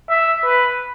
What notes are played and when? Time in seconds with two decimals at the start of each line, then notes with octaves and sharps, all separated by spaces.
0.09 E5
0.44 B4